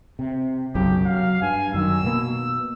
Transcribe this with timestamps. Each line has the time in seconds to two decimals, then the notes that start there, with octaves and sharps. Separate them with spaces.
0.19 C3
0.75 B1 F#2 C#3 G4
1.05 F#3 F5
1.42 G2 G#5
1.74 F#2 D#3 E6
2.05 B2 A#3